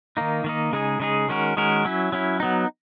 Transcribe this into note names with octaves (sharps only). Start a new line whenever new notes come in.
D#3 A#3 D#4
D#3 A#3 D#4
C#3 G#3 D#4 G#4
C#3 G#3 D#4 G#4
D#3 G#3 C#4 F#4 A#4
D#3 G#3 C#4 F#4 A#4
F#3 C#4 E4
F#3 C#4 E4
F#3 B3 D#4